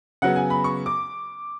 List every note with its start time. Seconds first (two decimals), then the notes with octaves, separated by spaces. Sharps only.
0.22 C#3 F#3 B3 F#5
0.36 G#5
0.50 B5
0.64 C#6
0.86 D6